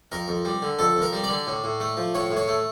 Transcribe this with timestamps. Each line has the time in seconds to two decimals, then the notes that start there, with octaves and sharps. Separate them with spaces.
0.12 F2 A#4
0.28 F2
0.45 G3
0.62 D3
0.79 F2 A4
0.97 F2
1.02 A#4
1.13 G3
1.24 D5
1.29 D3
1.47 A2
1.64 A2
1.80 A3
1.97 F3
2.14 A2 C#5
2.31 A2
2.37 C#5
2.48 A3